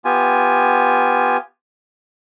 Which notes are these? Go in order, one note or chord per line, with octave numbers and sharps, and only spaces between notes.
B3 F4 G4 G#5